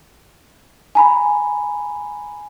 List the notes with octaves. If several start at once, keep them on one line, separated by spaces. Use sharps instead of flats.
G#5 A#5 B5